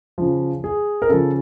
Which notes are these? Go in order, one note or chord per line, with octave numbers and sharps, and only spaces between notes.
C#3 F3
G#4
A#4
C#3 F3 A4